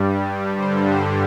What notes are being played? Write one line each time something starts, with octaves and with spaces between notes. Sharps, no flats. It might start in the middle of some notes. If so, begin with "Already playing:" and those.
Already playing: G2 G3
G2 D3 G3 C5
C5